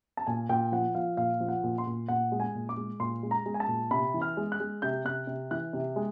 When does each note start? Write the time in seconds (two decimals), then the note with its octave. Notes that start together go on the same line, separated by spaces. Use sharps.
0.17 A5
0.27 A#2 G#5
0.49 A#2 G5
0.72 F3 F#5
0.95 F3 F5
1.17 A#2 F5
1.40 F3
1.48 F#5
1.63 A#2
1.78 C6
1.87 A#2
2.08 A#2 F#5
2.32 G#3
2.40 G#5
2.55 A#2
2.69 D6
2.77 G#3
3.00 A#2 C6
3.23 G#3
3.31 A#5
3.46 G#3
3.54 G#5
3.60 A5
3.68 A#2
3.91 C3 B5
4.14 E3
4.22 F6
4.37 G#3
4.52 F#6
4.60 G#3
4.82 C3 G6
5.05 C3 F#6
5.27 C3
5.51 E3 F#6
5.73 C3
5.96 G#3